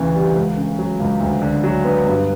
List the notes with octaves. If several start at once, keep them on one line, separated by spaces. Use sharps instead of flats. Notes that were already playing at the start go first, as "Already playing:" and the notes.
Already playing: D2 C#3 E3
G3
C#2
C#3
F#3
C#2
D2
D3
F#3
B3
G2